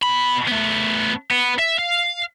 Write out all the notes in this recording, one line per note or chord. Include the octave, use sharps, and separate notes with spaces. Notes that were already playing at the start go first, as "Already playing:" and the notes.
B2 B5
A3 B3
B3
E5
F5